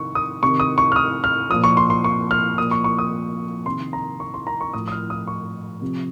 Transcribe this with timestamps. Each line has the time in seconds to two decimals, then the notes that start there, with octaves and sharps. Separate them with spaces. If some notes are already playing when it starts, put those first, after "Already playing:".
Already playing: C3 D#3 C#6
0.15 D#6
0.43 C3 D#3 C#6
0.60 D#6
0.78 C#6
0.92 F6
0.96 D#6
1.24 F6
1.50 A#2 F3 D#6
1.64 C#6
1.77 C6
1.90 C6
2.04 C#6
2.31 F6
2.58 A#2 F3 D#6
2.71 C#6
2.84 C#6
2.99 D#6
3.66 C3 D#3 C6
3.93 A#5
4.20 C#6
4.34 C6
4.47 A#5
4.61 C#6
4.73 A2 F3 D#6
4.88 D#6
4.92 F6
5.10 D#6
5.27 C#6
5.82 C3 F3